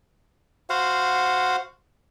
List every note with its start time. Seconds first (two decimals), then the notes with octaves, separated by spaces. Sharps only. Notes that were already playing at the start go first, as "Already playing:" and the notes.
0.70 F#4 C5 F5 F#5